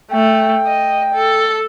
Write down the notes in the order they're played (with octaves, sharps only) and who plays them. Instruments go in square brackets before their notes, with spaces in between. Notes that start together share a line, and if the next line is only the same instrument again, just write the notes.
[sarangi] A3 [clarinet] G5
[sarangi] D#5
A4